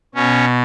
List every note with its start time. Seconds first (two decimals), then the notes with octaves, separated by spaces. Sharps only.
0.15 B2 C#4